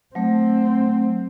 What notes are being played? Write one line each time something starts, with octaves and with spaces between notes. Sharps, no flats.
F#3 A3 C4